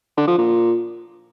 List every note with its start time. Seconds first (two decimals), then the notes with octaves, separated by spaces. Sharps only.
0.17 D3
0.28 F3
0.38 A#2